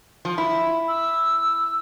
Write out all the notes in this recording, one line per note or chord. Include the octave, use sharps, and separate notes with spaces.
F3
E4
E6